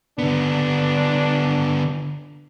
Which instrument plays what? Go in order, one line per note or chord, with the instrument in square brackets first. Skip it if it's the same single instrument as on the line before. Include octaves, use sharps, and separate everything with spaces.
[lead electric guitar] D3 B3 [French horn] D4